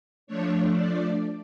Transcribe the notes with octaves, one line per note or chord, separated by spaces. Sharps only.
F3 A3 D4 C#5
D5